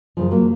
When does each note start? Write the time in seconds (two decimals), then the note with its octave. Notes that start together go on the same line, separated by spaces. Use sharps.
0.17 F#2 C#3 F3
0.31 F#3 A#3